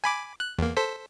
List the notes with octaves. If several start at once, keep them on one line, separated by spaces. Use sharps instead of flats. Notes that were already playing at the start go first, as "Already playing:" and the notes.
G#5 B5 D6
F#6
E2 A#3
A4 C5 B6